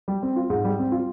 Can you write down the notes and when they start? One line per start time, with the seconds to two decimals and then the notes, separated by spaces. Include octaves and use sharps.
0.08 G3
0.23 C4
0.36 F4
0.50 G#2
0.65 G3
0.79 C4
0.92 F4